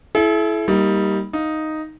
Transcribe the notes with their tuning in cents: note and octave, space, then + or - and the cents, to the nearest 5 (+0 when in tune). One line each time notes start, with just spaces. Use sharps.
E4 +10 A4 -45
G3 +0 A#3 +0 D#4 +20
D#4 +0 F5 +0